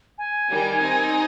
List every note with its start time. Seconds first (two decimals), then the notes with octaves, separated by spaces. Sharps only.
0.18 G#5
0.50 D#3 G3
0.82 C4 D#4